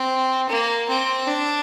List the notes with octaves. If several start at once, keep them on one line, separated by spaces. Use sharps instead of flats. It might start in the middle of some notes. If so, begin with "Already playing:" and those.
Already playing: C4
A#3
C4
D4